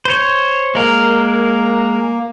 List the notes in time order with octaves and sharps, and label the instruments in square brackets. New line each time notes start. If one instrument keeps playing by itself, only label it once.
[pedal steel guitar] C5 C#5
[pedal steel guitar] G#3 A#4 [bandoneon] A#3